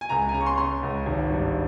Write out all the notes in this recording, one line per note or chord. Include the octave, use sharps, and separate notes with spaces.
G#5
C#2 A#5
A#5
G#5
C#3 A#5
C#6
C6
C#3 C6
C#2
G#1
G2